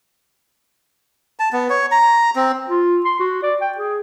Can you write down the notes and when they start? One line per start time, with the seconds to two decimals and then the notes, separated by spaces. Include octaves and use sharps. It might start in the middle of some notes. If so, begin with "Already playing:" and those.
1.39 A5
1.53 B3
1.70 C#5
1.92 A#5
2.36 C4
2.68 F4
3.05 C6
3.20 F#4
3.43 D5
3.61 G5
3.78 G#4